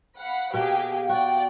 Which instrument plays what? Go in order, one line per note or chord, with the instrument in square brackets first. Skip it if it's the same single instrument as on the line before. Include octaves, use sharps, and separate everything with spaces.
[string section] F5 F#5 B5
[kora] B2 [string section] A#3 G4 G#4 [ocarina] F5
[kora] F#4 [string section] D5 G5